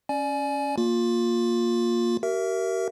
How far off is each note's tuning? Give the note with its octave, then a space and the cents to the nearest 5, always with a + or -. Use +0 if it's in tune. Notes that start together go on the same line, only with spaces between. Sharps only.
C#4 +0 D5 +10 G#5 +25
A#3 +0 F4 +20
G4 -45 A#4 +0 E5 +15